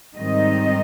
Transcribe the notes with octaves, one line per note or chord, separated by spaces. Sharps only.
G#2 D#3 G3 C4 D#4 D#5